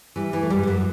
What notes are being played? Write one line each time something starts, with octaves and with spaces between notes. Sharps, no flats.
E3 G3
E3 G3
A3
F#2 G3
G3
F#2 F#3